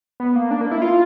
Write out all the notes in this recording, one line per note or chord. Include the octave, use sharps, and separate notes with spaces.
B3
A#3
D4
A#3
E4
F4